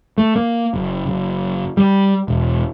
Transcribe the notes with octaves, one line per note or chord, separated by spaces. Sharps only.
A3
A#3
F#1
F#1
G3
E1